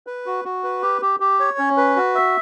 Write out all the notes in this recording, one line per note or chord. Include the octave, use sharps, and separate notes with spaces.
B4
F#4
F#4
B4
G4
G4
G4
C#5
C#4
B4
F#4
E5